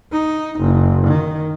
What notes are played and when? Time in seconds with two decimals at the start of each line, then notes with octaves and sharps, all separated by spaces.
0.12 D#4
0.60 F#1
1.07 D#3